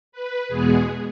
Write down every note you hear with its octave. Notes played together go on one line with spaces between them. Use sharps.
B4
E2 B2 G#3 B3 G#4